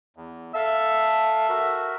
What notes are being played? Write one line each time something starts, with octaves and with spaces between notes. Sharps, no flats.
E2
A4 E5 F5 A5
F#4 A#4